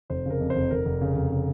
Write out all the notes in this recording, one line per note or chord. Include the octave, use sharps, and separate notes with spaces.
F1 C5
C#3 A#4
F2
C5
F1
F1 A#4
F1
C#3
F1
C#3